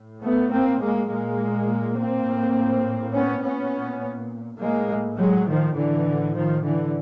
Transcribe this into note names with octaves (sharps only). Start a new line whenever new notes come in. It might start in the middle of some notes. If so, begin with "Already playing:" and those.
Already playing: A2
A3 B3
A#3 C4
G#3 A#3
A#2 G#3 A#3
A#3 C4
A2
B3 C#4
A#2 B3 C#4
A2 G#3 A#3
F#3 G#3
D#3 F3
A2 D3 E3
D#3 F3
D3 E3